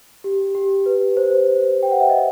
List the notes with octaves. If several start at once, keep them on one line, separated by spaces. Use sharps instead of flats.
G4
G4
B4
C5
G5
F#5
E5
D#5